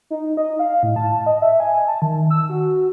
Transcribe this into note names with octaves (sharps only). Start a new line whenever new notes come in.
D#4
D#5
F5
A2
A5
D#5
E5
G#5
A5
D#3
E6
F#4